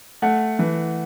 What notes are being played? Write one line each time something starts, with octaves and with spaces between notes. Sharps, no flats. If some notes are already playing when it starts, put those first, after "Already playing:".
A3 F#5
E3